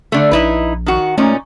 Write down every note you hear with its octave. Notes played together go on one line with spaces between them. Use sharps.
D3 A3
A#1 D#4 E4 B4
D#3 F#4
A#2 A3 C#4 D#4